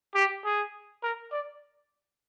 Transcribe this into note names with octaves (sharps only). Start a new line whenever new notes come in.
G4
G#4
A#4
D5